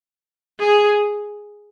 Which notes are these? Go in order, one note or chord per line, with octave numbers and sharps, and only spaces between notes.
G#4